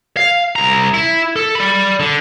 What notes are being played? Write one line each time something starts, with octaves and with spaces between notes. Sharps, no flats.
F5
C2 A#5
E4
A4
D5 B5
D3